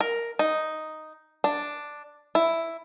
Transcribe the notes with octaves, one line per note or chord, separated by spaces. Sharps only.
A#4
D#4
D4
E4